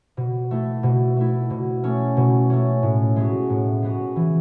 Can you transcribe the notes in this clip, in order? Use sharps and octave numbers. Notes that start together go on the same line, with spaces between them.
B2
A3 E4
B2
A3 E4
B2
A3 C#4
B2
A3 C#4
A2
G#3 B3 F#4
A2
G#3 B3 F#4
E3